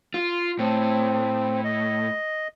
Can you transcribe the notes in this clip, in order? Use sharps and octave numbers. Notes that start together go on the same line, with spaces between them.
F4
A2 C4
D#5